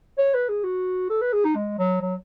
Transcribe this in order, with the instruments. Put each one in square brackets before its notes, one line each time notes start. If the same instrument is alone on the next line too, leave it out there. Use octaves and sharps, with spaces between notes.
[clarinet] C#5
B4
G#4
F#4
A4
B4
G#4
D#4
G#3
F#3
F#3